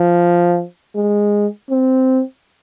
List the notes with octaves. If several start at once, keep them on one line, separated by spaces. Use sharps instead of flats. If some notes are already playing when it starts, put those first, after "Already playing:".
Already playing: F3
G#3
C4